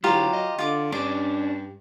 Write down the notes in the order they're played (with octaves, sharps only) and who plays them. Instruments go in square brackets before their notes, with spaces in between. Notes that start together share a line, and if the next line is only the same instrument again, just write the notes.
[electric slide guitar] D3 E4 [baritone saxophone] F#3 [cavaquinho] F4 G4 A#4
[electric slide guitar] D#5
[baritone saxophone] D3 [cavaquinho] F4 D6
[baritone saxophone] G2 [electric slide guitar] C#4 D4 [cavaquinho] D6